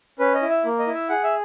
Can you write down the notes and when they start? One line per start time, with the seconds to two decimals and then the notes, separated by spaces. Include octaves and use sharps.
0.19 C#4 B4
0.34 D#5
0.42 E4
0.50 E5
0.65 A#3
0.79 D#5
0.87 E4
0.94 E5
1.09 G#4 F#5
1.24 E5